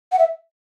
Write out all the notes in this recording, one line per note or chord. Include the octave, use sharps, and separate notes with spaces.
F#5
E5